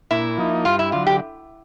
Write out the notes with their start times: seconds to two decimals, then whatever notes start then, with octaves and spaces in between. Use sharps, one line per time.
0.11 A#2 E4
0.38 F3 A#3 D#4
0.65 G2 F4
0.79 E4
0.92 D3 F#3 F4
1.07 G4